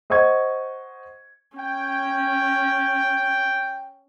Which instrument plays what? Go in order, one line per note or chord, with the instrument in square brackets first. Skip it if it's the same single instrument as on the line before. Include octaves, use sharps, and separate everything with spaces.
[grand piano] C5 D#5 F#5 C#6 G#6
[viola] C#4 [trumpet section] G5